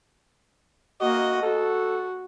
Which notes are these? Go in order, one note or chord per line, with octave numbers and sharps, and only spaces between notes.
A#3 F#4 D#5
F#4 A4